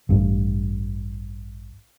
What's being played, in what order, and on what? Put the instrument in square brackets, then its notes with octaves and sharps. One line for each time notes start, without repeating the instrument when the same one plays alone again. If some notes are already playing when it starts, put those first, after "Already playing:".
[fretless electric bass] A1 G2